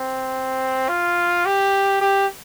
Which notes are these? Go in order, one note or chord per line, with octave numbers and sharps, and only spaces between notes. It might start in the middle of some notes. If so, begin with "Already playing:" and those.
Already playing: C4
F4
G4
G4